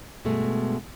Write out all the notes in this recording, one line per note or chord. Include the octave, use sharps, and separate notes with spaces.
G2 B2 G#3 A3